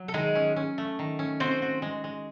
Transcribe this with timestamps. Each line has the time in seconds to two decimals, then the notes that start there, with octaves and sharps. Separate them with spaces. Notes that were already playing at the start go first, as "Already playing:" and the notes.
Already playing: F#3
0.08 A4
0.14 D#3 G#3 G#4
0.35 C#4
0.56 C#4
0.78 A3
0.99 D#3
1.19 C#4
1.40 C4 F#4 C5
1.62 F#4
1.82 G#3
2.04 G#3